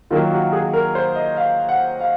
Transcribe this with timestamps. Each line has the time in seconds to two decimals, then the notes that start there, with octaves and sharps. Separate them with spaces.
0.10 D#3 F#3 A#3 F4
0.32 F#4
0.53 G#4
0.74 A#4
0.95 C5
1.16 D#5
1.37 F5
1.69 F#5
2.00 F5